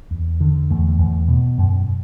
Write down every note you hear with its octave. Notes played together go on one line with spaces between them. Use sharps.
E2
D3
E2 A3
E2
B2
F#2